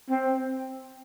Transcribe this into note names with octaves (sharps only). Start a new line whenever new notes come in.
C4